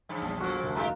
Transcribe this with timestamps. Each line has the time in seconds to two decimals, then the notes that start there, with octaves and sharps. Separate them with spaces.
0.09 G2 C#3 E3 F3 D4
0.22 A#1 E2 G3 A5 E6
0.40 A#2 F3 F#4 A4
0.63 F1 D2 A#4 E5 A5
0.75 G#2 G#3 G4 F5 A#5